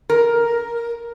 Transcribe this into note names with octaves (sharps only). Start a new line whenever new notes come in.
A#4